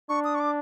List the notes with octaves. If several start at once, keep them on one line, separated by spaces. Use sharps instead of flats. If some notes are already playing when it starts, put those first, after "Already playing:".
D4 C#6
D#6
C#6
D6